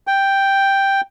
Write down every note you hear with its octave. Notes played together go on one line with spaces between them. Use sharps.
G5